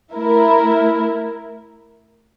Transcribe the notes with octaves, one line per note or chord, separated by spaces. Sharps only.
A3 E4 A#4